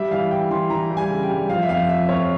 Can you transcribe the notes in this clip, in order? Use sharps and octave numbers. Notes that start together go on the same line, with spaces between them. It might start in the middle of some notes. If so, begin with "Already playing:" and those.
Already playing: G3 E5
E3 F5
E3 G5
E3 C6
E3 A#5
G3
G#5
C#3
G5
G3
F3 F5
E5
F2 F5
F3 E5
F2 C#5